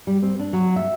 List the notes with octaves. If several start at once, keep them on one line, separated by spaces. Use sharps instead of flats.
G3
C4
D4
F#3
E5